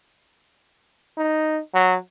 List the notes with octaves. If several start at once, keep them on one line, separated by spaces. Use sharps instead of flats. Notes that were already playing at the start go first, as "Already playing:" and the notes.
D#4
F#3